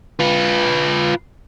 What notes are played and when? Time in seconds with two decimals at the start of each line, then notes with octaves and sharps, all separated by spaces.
0.19 F4 B4